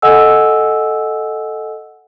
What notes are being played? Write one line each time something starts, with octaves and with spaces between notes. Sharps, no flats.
A4 D#5 F#5 G#5 E6